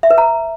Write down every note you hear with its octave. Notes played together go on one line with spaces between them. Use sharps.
E5
B4
A#5